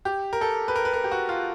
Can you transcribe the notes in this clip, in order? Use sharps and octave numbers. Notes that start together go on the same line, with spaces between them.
G4
A#4
A4
B4
A#4
B4
A#4
G4
F#4
F4